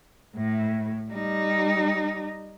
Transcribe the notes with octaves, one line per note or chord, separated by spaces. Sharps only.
A2
G3 D#4